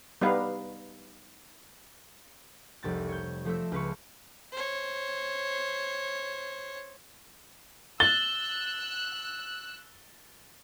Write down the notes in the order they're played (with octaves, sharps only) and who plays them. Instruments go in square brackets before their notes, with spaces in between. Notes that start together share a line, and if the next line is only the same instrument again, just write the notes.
[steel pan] G3 B3 D#4 B4 F5
[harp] F1 C2 C4 A6
C#5 G6
F3 A3 C4 E5
C#2 B4 C#6
[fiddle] C5 C#5
[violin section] E6 F#6 [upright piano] A6 [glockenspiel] G7